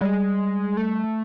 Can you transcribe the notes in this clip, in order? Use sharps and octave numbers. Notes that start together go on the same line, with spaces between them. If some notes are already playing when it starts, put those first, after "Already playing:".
G3 G#3
A3